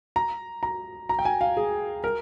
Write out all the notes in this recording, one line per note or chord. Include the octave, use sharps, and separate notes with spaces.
A#5
A#5
A#5
G5
G#5
F5
G#4
A#4